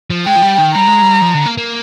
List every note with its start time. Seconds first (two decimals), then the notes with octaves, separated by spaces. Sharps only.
0.10 F3
0.27 G#3 G5
0.37 F3
0.42 G3
0.58 D#3
0.74 G3 A#5
0.87 G#3
1.02 G3
1.22 F3
1.34 D3
1.46 A#3
1.58 A#3